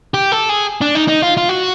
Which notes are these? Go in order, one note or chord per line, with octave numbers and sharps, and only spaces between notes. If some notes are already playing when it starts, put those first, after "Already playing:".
G4
A4
G#4
D4
D#4
D#4
F4
F4
F#4